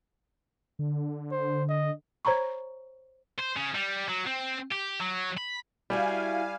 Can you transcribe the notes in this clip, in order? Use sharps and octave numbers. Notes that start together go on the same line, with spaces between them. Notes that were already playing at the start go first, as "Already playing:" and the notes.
D3
C5
D#5
C5 C#5 A#5 B5 C#6
C5
C#3
G3
F#3
C4
G4
F#3
B5
G3 E4 F#4 G4 F5 G#5